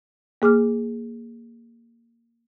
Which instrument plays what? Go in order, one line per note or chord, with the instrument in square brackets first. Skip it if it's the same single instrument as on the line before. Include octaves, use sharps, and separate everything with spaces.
[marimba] A#3 G#4 D6 F6